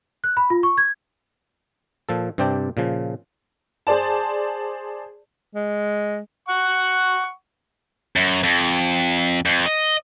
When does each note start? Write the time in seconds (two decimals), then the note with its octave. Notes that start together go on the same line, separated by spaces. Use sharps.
0.24 F#6
0.37 B5
0.50 F4
0.63 C#6
0.78 G#6
2.09 A#2 F3 A4
2.38 G2 C3 C4 D5 G5 A5
2.77 A#2 C#3 F3
3.87 G#4 C5 D5 A5
5.55 G#3
6.49 F#5 C#6
8.16 F#2
8.43 F2
9.46 F2
9.66 D#5